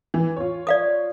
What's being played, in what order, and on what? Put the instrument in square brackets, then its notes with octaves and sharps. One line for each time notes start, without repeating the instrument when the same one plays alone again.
[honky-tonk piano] E3
F4 C#5
[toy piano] D5 F5 D#6